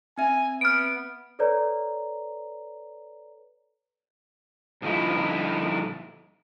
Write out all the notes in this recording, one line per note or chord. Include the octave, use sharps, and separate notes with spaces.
C4 E5 G#5
B3 F6 D7
A4 B4 C#5 D5 A#5
G2 A#2 D3 F3 D#4 E4